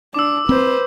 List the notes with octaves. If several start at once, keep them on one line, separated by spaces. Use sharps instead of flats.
D4 D6 E6
C4 B4 C5